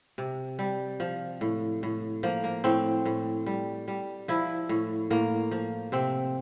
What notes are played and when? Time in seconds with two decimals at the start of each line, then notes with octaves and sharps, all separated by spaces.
0.18 C3
0.59 G3
1.00 F3
1.41 A2
1.83 A2
2.23 F3 A#3
2.44 A#3
2.64 A2 C4
3.05 A2
3.46 G3
3.88 G3
4.28 F3 E4
4.69 A2
5.10 A2 A#3
5.51 F3
5.92 C3 C4